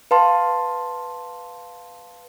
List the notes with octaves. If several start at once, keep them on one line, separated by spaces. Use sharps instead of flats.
B4 F5 A5 C6